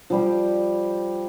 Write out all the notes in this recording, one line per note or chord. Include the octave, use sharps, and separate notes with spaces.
F3 G3 G4